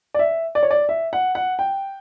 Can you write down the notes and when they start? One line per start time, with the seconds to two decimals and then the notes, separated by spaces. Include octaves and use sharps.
0.14 D5
0.19 E5
0.55 D5
0.63 C#5
0.71 D5
0.89 E5
1.13 F#5
1.35 F#5
1.59 G5